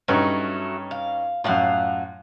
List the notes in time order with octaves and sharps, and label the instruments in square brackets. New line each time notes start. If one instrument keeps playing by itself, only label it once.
[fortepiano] G2 C#4 D#4 [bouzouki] F#3 A3
[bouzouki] F5
[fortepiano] F#2 A2 [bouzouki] F4 F5 F#5